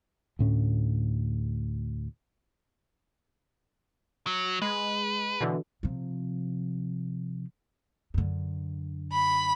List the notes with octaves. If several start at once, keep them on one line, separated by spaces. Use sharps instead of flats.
D2 A2 C#4
F#3
G#3 B4
B2 D3 E3
C3 F3
F#2 D3
B5